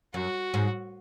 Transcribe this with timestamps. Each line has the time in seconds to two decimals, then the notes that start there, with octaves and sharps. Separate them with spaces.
0.14 F#2 F#4
0.54 G#2